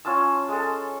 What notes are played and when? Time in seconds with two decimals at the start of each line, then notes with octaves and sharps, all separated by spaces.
0.05 C#4 F4 A5 E6
0.48 G#3 A4